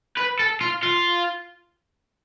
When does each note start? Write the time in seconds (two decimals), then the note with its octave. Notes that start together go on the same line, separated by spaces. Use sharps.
0.17 B4
0.40 A4
0.61 F4
0.83 F4